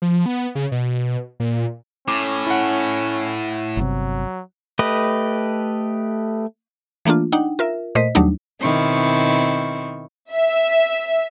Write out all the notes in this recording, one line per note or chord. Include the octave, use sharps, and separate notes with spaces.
F3
B3
C#3
B2
A#2
A2 C#4 D6
E4 F#5
G1 C3 F#3
A3 G4 B4 D#5
E3 A3 A#3 D4 F4
D4 D#4 F#5 G5
F4 A#4 E5
A#2 A3 C5 D#5 B6
D#2 F#3 G3 A3 D4 D#4
B2 D#3 C4 E4 C#6
E5